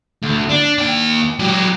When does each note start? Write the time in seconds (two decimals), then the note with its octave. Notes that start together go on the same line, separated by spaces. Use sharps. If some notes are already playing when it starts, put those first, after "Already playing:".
0.23 D2
0.49 D4
0.78 D#2 G5
1.40 F#3 G4